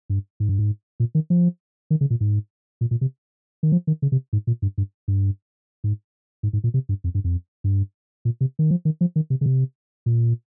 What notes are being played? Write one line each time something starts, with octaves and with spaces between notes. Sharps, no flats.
G2
G#2
G2
G#2
A#2
D#3
F3
D#3
C#3
A#2
G#2
A#2
A#2
C3
D#3
F3
D#3
C#3
C3
G#2
A#2
G2
G2
G2
G#2
G#2
G#2
A#2
C3
G2
F2
G2
F2
G2
A#2
C3
D#3
F3
D#3
F3
D#3
C3
C#3
C3
A#2